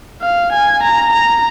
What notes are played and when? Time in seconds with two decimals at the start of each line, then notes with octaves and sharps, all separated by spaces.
0.21 F5
0.52 G#5
0.83 A#5
1.13 A#5